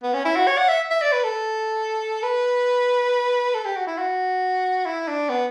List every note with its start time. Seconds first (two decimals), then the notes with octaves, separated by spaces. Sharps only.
0.03 B3
0.14 C#4
0.25 E4
0.36 F#4
0.47 C#5
0.58 F#5
0.69 E5
0.90 E5
1.02 D5
1.13 B4
1.24 A4
2.23 B4
3.54 A4
3.65 G4
3.77 F#4
3.87 E4
3.98 F#4
4.86 E4
5.08 D4
5.30 B3